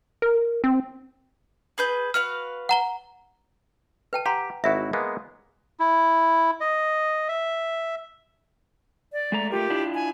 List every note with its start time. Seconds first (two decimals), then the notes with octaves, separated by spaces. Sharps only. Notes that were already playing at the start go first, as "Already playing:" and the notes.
0.22 A#4
0.64 C4
1.78 G#4 B4 G6
2.14 F#4 B4 F5 F6
2.69 F#5 A#5 G7
4.13 B4 G5 A5
4.26 G4 F#5 A#5 C6
4.64 G#1 E4 F#4 E5
4.93 G#3 A#3 B3
5.80 E4
6.60 D#5
7.29 E5
9.13 D5
9.32 G#3 A3 A#5
9.51 A3 F4 G4 A#4
9.70 D4 E4 F4
9.94 G#5